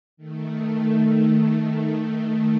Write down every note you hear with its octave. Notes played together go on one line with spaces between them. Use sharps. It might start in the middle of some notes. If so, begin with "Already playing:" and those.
D#3 A3